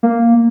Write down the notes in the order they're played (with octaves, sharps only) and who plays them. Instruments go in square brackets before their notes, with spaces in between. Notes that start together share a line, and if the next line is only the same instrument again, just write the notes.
[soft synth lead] A#3